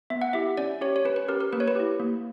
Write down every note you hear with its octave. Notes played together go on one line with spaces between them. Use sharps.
B3 E5
F#5
E4 G4 E5
C#4 D5
G4 C#5
C#5
C#4 B4
B4
G4 A#4
A#4
A#3 B4
C#5
B4
E4 G4
A#3